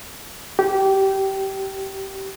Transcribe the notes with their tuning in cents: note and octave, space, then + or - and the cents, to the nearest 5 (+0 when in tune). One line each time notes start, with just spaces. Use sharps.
G4 -20